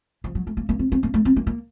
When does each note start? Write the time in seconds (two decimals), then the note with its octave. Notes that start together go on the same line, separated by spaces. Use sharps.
0.24 F3
0.35 F#3
0.47 A3
0.57 A#3
0.69 A#3
0.79 C4
0.92 C4
1.03 A#3
1.14 A3
1.25 C4
1.36 A#3
1.47 A#3